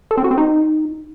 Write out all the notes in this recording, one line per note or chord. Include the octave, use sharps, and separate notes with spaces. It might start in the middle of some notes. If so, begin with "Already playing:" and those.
A4
C4
F#4
C4
D#4